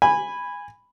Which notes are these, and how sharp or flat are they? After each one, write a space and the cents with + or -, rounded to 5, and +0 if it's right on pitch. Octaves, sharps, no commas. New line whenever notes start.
G#5 -15 B5 +0